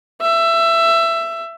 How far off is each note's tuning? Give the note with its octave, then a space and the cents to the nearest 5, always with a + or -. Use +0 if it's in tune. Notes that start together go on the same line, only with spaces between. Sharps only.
E5 +20